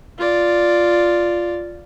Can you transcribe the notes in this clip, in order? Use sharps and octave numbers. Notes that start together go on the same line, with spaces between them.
F4 D5